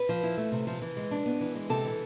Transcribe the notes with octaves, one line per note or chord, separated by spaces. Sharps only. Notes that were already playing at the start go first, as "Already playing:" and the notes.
Already playing: B4
F3
E4
A3
C3
F3
E3
G#3
D4
B3
E3
G#3
C3 A4
E3